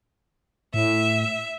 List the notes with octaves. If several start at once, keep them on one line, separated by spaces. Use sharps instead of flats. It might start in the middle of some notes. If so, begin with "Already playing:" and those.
A2 E5